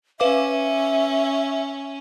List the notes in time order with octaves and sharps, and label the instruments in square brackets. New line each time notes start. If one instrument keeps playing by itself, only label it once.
[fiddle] C#4 [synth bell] B4 F5 D6 [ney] E5